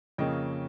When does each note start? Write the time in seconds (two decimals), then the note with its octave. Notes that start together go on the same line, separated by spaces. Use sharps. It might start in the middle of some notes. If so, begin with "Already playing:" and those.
0.18 F2 C#3 F3 A#3 C#4 D#5 G5